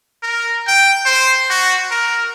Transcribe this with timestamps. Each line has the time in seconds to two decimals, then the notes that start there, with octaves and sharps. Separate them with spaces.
0.23 A#4
0.68 G5
1.06 C5
1.50 F#4
1.91 A#4